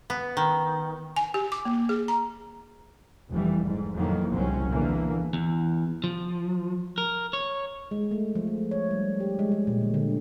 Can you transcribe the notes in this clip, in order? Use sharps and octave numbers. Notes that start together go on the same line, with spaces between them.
B3
D#3
G#5
G4
D6
A#3
G#4
A#5
F1 E3 G3
G#2
F2 A2 D#3 E3 F#3 A#3
F#1 C2 A#2 F#3 C4 C#4
E2 D3 E3 A#3
E2
F3
A#4
C#5
G#3
A3
F3
A3
C#5
G3
G4
G#3
G#3
A#2
D3
D3